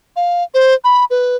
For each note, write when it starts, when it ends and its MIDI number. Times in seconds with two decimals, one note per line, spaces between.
0.16 0.43 77
0.54 0.74 72
0.84 1.05 83
1.10 1.36 71